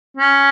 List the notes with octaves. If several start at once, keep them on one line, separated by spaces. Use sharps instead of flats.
C#4